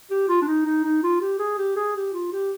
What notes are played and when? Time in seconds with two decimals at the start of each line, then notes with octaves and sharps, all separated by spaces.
0.10 G4
0.28 F4
0.42 D4
0.48 D#4
0.65 D#4
0.84 D#4
1.03 F4
1.21 G4
1.39 G#4
1.58 G4
1.76 G#4
1.96 G4
2.13 F4
2.32 G4